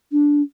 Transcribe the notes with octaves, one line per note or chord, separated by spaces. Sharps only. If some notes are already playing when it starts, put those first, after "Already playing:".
D4